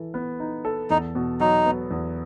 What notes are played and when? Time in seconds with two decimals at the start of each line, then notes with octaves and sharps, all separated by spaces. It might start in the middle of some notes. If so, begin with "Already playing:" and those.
Already playing: E3 A4
0.14 B3
0.40 D#4
0.65 A4
0.90 E2 D#4
1.15 B2
1.40 F#3 D#4
1.66 B3
1.91 E2